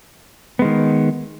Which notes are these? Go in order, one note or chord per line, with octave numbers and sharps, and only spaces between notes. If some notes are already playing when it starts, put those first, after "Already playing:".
D#3 G#3 B3